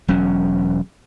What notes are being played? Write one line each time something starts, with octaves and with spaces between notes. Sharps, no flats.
E1 F#3 C#4